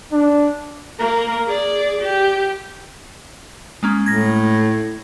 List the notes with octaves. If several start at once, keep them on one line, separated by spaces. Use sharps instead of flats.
D4
A#3 A#4
G#4 D5
G4
G#3 A#3 C#4
A2 G#6 A#6